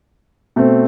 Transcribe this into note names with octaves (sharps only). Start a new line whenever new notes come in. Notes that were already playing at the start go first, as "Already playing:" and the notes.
B2 A3 C4